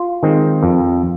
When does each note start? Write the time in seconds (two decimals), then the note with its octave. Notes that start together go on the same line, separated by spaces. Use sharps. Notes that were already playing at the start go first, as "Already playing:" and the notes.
Already playing: F4
0.23 D#3 G#3 C4
0.63 F2